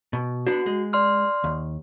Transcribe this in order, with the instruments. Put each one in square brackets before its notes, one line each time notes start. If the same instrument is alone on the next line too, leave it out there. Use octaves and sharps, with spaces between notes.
[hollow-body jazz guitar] B2
[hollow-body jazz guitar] B3 D4 [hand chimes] F#4
[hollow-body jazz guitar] G#3
[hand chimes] D5 C6 F6
[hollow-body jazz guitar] D#2